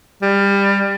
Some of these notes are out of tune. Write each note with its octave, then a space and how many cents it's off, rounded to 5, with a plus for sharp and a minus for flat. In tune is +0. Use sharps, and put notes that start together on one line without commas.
G3 +20